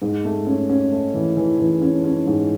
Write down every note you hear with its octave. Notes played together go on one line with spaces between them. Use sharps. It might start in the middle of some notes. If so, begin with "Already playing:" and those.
G#2
A3
C#4
C#4
A3
E3
E3
E3
C#4
C#4
G#2